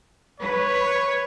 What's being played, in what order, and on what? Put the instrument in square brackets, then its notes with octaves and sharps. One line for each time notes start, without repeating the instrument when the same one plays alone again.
[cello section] B4 [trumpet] C#5